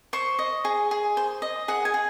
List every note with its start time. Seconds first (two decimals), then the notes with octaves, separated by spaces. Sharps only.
0.13 C5 C#6
0.39 D#5
0.65 G#4
0.91 G#4
1.17 C5
1.42 D#5
1.68 G#4 F#5
1.85 G#5
1.94 G#4